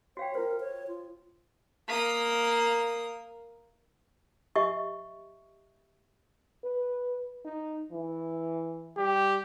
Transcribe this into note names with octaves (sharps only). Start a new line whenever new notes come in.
F#4 C#5 F5 G5
F4 A#4 C5
C#5
F4
A#3 D#6
G4 D#5 E5 C#6
B4
D#4
E3
G3 G4